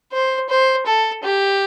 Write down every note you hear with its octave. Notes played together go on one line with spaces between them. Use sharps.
C5
C5
A4
G4